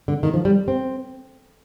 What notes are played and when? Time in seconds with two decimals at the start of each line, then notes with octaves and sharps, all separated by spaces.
0.08 D3
0.23 D#3
0.34 F3
0.45 G3
0.68 C4